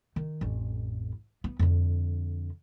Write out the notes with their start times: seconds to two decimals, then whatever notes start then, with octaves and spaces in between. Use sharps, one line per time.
0.16 D#3
0.41 A1 F2
1.44 B3
1.59 F2 D3